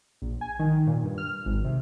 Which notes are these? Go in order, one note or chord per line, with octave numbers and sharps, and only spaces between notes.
A#1
G#5
D#3
A#2
G2
F6
G#1
C3